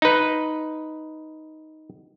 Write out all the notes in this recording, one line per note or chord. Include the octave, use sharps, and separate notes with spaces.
D#4 B4